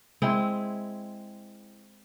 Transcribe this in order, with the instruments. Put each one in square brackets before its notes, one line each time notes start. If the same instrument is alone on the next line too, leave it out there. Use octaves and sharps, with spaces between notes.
[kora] G#3 C4 E4